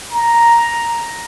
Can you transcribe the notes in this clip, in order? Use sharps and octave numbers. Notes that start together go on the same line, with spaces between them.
A#5